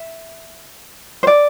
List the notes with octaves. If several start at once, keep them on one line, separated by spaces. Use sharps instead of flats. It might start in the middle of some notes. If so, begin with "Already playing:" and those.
Already playing: E5
C5
D5